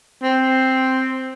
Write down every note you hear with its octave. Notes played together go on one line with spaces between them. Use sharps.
C4